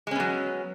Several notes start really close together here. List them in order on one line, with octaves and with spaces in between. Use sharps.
G#3 C#4 B3 F#3